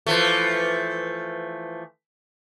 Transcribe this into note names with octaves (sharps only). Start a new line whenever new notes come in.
E3 F3 A3